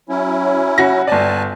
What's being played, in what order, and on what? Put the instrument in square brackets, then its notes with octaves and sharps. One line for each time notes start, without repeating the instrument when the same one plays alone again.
[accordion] F#3 C#4 E4
[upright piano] F#4 A#6
[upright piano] G1 D5 [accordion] G#5 A5